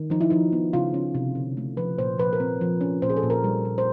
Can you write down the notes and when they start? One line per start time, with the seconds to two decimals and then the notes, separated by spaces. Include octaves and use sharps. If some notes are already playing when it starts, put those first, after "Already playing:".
Already playing: D#3
0.10 F3 D#4
0.21 E4
0.30 F3 D#4
0.53 B3
0.73 C#3 F4
0.94 C#4
1.15 C3
1.35 D3
1.57 A3
1.77 F3 B4
1.98 A#2 C5
2.18 F3 B4
2.33 A#4
2.40 C4
2.61 F3
2.81 C#4
3.02 A#2 C5
3.10 G#4
3.17 A4
3.23 A#2
3.30 A#4
3.44 G3
3.65 G3
3.78 C5